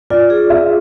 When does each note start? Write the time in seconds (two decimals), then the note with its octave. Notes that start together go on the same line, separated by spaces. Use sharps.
0.10 F4 D5
0.30 G#4
0.50 C4 E5